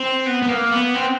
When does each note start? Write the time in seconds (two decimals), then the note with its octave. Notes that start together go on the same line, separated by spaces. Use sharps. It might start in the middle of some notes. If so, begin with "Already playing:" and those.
Already playing: C4
0.26 B3
0.42 B3
0.49 A#3
0.71 B3
0.95 C4